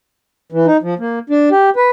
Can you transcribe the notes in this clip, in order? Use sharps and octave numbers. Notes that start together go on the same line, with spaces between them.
E3
D#4
F3
A#3
D4
G4
B4